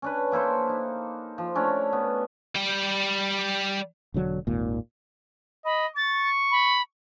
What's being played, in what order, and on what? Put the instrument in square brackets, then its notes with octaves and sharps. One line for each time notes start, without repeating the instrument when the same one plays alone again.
[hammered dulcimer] C#4 D4 B4
A#3 E4 A4 C5
D#4
F3
A3 C#4 D4 E4
B3
[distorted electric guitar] G3 G5
[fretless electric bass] E1 D3 F#3 D4
G#1 D#2 A#2
[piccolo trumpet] D#5 [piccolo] B5
[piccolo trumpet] C#6 [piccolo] A6
[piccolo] B5